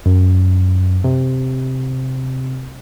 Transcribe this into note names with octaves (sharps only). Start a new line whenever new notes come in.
F#2
C3